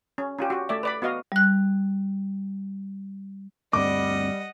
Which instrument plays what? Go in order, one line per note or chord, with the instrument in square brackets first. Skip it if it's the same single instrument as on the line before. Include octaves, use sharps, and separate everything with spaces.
[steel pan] C#4
C#4 F4 G4
F#4 G4
A3 D5 E5
B4 D5 B5
B3 F#4 D#5 F5
[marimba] G3 F#6
[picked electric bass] D2 G2 C4 [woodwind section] G3 [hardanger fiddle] D#5 F#5 [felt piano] D6